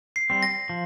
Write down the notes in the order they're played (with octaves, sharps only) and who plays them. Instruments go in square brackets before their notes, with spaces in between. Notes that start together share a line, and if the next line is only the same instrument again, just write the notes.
[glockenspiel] C7
[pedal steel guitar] G3 C4
[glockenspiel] A#6
[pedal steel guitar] F3